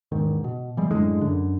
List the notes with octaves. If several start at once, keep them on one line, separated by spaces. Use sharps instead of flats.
E1 G#2 D#3
B2
E3 G3 G#3
F#2 A2 D3 G#3
F#2 D3